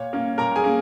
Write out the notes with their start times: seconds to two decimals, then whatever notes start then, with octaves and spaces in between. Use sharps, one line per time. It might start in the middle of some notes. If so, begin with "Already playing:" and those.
Already playing: A#2 C#5
0.13 A#3 C#4
0.38 A#2 A#4 A#5
0.56 G#4 G#5
0.64 A#3 C#4